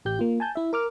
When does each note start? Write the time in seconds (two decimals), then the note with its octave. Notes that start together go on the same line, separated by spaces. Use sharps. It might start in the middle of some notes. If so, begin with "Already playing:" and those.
0.05 A1 G4 G6
0.19 A#3 F4
0.40 G#5 A5 G6
0.55 E4 E5
0.73 A#4 D6 F6